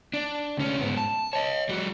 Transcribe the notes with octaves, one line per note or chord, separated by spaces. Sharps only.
D4
D2 C#4
G#2 B3
A5
C#5 D#5
G3 F#4